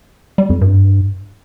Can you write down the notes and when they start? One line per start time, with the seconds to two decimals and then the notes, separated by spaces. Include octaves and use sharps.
0.38 G3
0.50 F2
0.61 G2